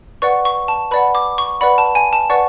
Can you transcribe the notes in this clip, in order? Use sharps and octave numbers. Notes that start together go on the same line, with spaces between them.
B4 D5 F#5 C#6
C#6
A5
B4 D5 F#5 B5
D6
C#6
B4 D5 F#5 B5
A5
G#5
A5
B4 D5 F#5 C#6